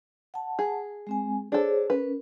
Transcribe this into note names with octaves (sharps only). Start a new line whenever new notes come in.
F#5 A5
G#4
G#3 C4 G#5
D4 G#4 A4 C5 C#5
C#4 A#4 B4